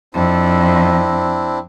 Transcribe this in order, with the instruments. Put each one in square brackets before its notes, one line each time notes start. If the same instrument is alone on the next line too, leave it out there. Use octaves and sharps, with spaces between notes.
[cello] F2 [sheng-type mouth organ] C4 D4 E4